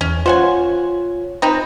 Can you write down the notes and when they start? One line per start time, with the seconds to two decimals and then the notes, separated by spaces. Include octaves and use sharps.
0.01 E2 C#4
0.26 F4 C5 C#5 F#5 G#5
1.42 C4 D#4 B4